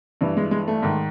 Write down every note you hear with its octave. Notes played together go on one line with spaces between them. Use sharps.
G2 E3
G#3
G#3
A3
G#2 D#3